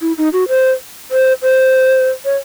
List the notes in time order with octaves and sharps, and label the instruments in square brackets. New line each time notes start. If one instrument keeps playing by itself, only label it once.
[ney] E4
D#4
F#4
C5
C5
C5
C#5